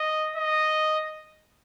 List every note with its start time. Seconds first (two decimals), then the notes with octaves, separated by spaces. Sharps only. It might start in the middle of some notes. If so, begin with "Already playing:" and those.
Already playing: D#5
0.36 D#5